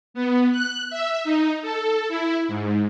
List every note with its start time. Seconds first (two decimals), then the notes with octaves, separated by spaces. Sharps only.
0.14 B3
0.52 F#6
0.90 E5
1.24 D#4
1.62 A4
2.09 E4
2.48 G#2